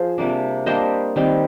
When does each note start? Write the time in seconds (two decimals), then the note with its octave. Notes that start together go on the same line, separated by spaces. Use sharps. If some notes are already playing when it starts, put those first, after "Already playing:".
Already playing: F3 G#4 C5
0.18 C3 G3 A#3 D4
0.66 G3 A#3 D4 C5 D#5
1.16 D#3 G3 C4 D#4